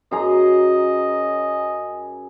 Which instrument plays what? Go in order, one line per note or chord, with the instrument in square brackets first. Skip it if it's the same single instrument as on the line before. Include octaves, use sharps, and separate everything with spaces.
[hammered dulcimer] F#2 G#4 A#5 [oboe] D#5